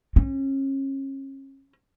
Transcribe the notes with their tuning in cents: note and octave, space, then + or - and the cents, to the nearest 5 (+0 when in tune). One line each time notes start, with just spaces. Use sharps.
C#4 -35